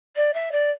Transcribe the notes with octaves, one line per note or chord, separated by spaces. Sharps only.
D5
E5
D5